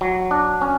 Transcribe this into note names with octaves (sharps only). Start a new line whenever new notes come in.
F#3
D4
C#4